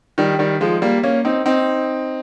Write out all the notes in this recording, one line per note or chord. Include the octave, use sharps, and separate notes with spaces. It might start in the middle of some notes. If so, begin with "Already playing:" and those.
D#3 G3
D#3 G3
F3 G#3
G3 A#3
A#3 C#4
C4 D#4
C4 D#4